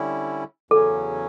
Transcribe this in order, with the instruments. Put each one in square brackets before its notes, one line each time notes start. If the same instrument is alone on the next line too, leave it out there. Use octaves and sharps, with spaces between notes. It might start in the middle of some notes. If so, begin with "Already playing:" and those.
Already playing: [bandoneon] D3 G3 C#4 E4
[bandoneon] E2 C#3 F#3 C#4 [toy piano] A4